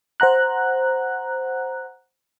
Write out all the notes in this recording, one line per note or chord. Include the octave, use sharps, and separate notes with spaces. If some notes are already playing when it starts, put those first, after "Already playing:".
C5 F#5 A#5 F#6